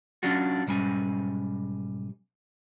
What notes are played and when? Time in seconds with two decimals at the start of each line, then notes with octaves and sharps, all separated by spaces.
0.23 F#3 C#4 D4 F4 F#4
0.67 B1 G#2 G3 C#4 G#5